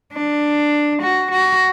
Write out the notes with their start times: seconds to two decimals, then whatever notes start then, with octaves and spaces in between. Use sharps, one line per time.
0.13 D4
1.02 F#4
1.31 F#4